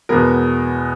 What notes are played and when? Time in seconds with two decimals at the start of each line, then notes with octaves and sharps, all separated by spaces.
0.09 E2 B2 G#3 B3 A#4